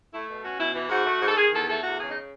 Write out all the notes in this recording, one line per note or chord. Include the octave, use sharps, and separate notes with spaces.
A3 E4
B2
C#4 F#4
B2 E4
E3
G#2 F#4
A3
G#2
A4
D#3 G#4
E2 A4
A3 A4
E2 F#4
C#3 G#4
D#4